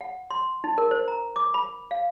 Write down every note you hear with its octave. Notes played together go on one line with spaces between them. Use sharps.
F#5
C6
D#4
A#4
C5
A#5
D6
B5
F5